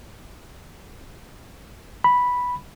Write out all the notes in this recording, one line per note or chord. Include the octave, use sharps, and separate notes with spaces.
B5